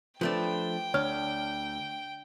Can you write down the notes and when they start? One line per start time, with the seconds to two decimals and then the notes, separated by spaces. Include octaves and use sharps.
0.21 F3 A3 D4 B4 D5 G5
0.94 D2 D4 C#5 F6